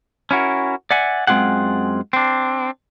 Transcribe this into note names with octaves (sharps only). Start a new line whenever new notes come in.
C#4 E4 F#4 A#4
D5 E5 F#5 G#5
F#2 G#3 C4 F4 G#4 F#5
C4 D4